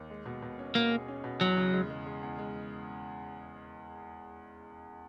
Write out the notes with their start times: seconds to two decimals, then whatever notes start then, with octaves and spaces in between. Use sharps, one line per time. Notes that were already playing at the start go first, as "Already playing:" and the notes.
Already playing: D#2
0.10 G#3
0.26 B2
0.42 B2
0.59 C#4
0.75 B2 A#3
0.91 G#4
1.08 C#4
1.24 B2
1.41 E2 F#3
1.57 C#3
1.73 G#3
1.90 G#3
2.06 G#3
2.23 E2
2.38 G#3